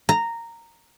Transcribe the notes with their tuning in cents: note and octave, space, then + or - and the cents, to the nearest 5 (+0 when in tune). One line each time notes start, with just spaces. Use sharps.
A#5 -10